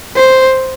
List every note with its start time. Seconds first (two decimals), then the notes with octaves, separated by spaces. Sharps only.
0.15 C5